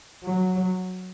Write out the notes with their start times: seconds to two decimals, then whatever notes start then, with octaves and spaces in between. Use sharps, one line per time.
0.24 F#3